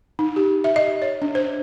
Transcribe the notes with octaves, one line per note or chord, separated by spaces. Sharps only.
D#4
G4
E5
D#5
C#5
D4
C5